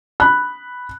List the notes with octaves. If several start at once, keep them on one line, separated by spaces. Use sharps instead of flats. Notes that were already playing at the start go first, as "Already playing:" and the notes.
B5 F#6